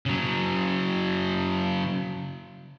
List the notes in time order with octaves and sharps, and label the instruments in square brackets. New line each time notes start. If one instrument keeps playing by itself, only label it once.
[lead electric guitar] C#3 F#3